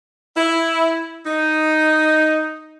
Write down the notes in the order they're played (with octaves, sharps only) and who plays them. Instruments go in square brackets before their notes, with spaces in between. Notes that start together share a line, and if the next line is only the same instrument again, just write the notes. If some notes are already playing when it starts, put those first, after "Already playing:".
[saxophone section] E4
D#4